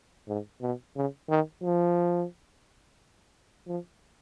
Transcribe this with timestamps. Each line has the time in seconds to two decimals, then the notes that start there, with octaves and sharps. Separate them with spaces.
0.28 G#2
0.62 B2
0.96 C#3
1.30 D#3
1.64 F3
3.68 F3